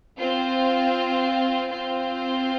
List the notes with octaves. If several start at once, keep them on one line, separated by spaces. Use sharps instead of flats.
C4 F4 C5
C4 F4 C5